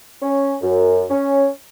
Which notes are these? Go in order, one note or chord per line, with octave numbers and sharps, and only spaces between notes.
C#4
F#2
C#4